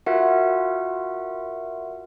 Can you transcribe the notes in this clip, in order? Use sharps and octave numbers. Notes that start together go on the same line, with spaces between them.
F4 F#4 A#4 E5 F#5